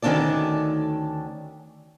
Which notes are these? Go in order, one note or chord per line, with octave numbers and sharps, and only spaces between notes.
D2 D#3 C#4 D4 A4 D5